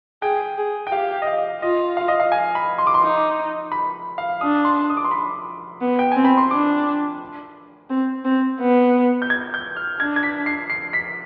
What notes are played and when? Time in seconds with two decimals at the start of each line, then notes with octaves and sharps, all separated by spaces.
0.22 G#4 G5
0.58 G#4
0.87 G5
0.92 G4 F5
1.22 D#5
1.27 F5
1.62 F4 D#5
1.97 F5
2.08 D#5
2.20 F5
2.32 G#5
2.55 B5
2.78 C6
2.87 D6
2.94 C6
3.02 D#4
3.72 B5
4.18 F5
4.41 D4 D#6
4.65 C6
4.90 D#6
4.97 D6
5.04 C6
5.11 B5
5.81 B3
5.99 G5
6.12 C4 G#5
6.25 B5
6.37 C6
6.51 D4 D6
7.90 C4
8.25 C4
8.61 B3
9.22 G6
9.30 G#6
9.54 G6
9.76 F6
10.00 D4 G#6
10.16 G#6
10.23 B6
10.46 C7
10.70 C7
10.93 B6